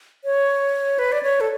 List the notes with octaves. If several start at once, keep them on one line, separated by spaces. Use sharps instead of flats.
C#5
B4
D5
C#5
A4